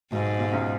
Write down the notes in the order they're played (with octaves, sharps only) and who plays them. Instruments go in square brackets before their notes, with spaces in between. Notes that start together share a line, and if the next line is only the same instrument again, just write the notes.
[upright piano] B1 B2 [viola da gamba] G#2
[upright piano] B1 B2
C#2 C#3